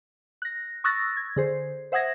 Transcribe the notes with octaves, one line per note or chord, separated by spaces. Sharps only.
F#6 A#6
C#6 D#6 E6 F#6 A6 A#6
G#6
D3 G#4 C5
C5 E5 F#5 D#6 G#6 A#6